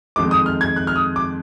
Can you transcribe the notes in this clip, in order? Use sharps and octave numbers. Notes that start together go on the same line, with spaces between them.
F2 D#3 G#3 D6
D#6
F6
G#6
F#6
F6
D#6
D6